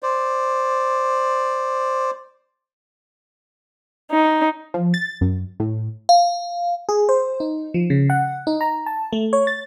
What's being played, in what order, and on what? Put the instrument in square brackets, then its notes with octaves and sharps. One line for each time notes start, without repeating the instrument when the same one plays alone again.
[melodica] C5 D5
[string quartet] D#4
[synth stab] F3
A6
F#2
A2
[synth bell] F5
[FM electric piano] G#4
C5
D#4
F3
C#3
F#5
D#4
A#5
A5
A3
C#5
A6